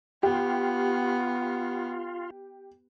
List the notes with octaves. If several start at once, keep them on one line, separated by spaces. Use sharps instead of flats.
B3 F4 G4